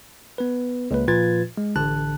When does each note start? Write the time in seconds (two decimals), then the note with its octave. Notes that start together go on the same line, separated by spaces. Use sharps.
0.38 B3 B4
0.91 C#2 A#3 B4
1.08 A#2 F3 F4 B4 G#6 A6
1.57 G#3
1.76 A1 D3 A5 F#6